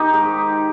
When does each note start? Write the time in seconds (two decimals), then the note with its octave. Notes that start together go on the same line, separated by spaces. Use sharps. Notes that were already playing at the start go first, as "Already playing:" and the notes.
Already playing: D#3 D#4 G4
0.14 G#2